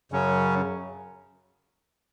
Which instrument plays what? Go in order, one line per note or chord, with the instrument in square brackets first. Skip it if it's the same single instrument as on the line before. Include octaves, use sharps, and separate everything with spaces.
[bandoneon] F#2 C#3 F#3 C#4